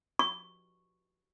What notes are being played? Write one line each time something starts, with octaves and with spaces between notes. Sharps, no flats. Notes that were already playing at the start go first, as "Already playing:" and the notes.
C#6